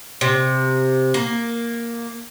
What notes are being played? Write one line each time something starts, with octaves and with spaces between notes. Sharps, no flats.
C3
A#3